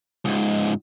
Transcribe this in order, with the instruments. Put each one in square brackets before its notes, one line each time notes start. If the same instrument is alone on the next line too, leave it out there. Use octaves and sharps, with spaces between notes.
[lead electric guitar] C#2 G#2